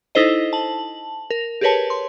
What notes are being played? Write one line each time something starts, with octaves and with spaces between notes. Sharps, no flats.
D#4 E4 A4 C5 D#5
A5 F#7
A#4
G4 G#4 A#4 B4 C#5 A5
C6